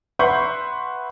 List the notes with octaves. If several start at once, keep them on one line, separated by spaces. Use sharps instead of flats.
B4 E5 F#5 C6 C#6 G6